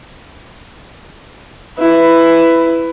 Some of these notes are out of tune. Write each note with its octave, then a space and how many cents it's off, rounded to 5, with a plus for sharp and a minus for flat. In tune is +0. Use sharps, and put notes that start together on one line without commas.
E4 +10 B4 +15